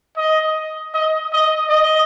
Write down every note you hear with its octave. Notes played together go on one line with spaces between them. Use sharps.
D#5
D#5
D#5
D#5